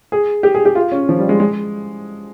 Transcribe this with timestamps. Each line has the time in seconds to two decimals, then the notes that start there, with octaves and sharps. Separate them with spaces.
0.12 G#4
0.43 G4
0.55 G#4
0.65 G4
0.75 F4
0.92 C#4
1.09 F3
1.19 G3
1.29 G#3
1.40 G#3